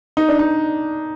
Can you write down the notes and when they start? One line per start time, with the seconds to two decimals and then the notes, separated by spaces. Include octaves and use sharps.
0.17 D#4
0.28 D4
0.39 D#4